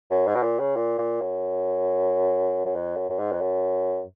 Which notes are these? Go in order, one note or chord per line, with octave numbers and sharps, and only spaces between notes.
F#2
G#2
B2
A#2
C#3
A#2
A#2
F#2
F#2
F2
F#2
F#2
G#2
F2
F#2